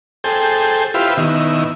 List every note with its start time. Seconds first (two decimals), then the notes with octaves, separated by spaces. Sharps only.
0.24 G#4 A4 C5 G5
0.94 E4 F4 G4 B4 C5
1.17 B2 D#3 E4